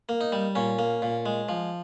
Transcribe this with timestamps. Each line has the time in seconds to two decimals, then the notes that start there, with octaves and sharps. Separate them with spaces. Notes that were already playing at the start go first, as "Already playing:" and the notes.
0.09 A#3
0.21 D#4
0.32 G3
0.55 A#2 C#4
0.79 A#3
1.02 A#2
1.26 G#3
1.49 F3